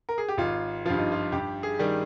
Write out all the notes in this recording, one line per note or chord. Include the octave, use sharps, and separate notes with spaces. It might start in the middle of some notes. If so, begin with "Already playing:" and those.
A#4
G#4
G4
G#1 F4
G2 F3 F4
D#4
F4
G2 G4
G#4
D#3 G3